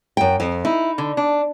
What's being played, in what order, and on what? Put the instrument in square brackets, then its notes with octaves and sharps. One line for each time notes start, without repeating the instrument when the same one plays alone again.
[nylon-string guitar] F#2 G5
F2
[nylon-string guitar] D#4 [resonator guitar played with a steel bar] E4
[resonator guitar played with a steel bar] D3
D4